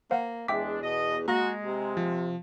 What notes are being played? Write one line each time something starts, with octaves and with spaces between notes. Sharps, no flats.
A#3 C5 F5 F#5
E2 G#3 D4 E5 G5 D6 B6
B2 D#5
G#3 A#3 F#4 A#5 A#6
C3
F3